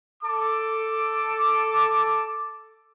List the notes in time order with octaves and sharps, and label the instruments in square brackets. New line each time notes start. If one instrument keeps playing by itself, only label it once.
[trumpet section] A4 D6